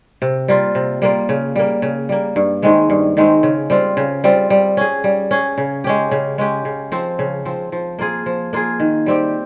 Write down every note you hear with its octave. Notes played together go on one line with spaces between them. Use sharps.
C3
G3 A#3 F4
C3
G3 A#3 F4
C#3
G3 A#3
C#3
G3 A#3
G2
D#3 G#3 C4
G2
D#3 G#3 C4
C#3
G3 C4 F4
C#3
G3 C4 F4
G3
C#4 G#4
G3
C#4 G#4
C#3
G#3 C#4 G4
C#3
G#3 C#4 G4
C#3
F3 C4
C#3
F3 C4
F3
A#3 F4 G#4
F3
A#3 F4 G#4
D#3
G3 C4 G4